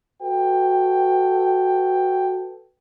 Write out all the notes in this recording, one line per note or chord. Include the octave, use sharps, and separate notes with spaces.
F#4 A4 B4 G5